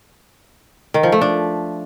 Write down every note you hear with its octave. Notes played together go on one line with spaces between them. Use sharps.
D#3
F3
A3
D4